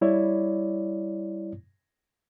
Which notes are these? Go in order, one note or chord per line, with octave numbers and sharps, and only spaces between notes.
G3 E4 C#5 D5